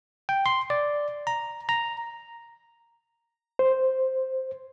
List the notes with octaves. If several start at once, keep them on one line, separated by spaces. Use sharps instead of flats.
G5
C6
D5
A#5
A#5
C5